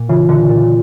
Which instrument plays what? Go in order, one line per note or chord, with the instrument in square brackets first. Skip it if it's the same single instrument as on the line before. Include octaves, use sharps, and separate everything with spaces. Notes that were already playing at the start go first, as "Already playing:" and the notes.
Already playing: [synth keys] A#2
[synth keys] C#3 E3 [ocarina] F4
[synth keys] A#2 D3
A#2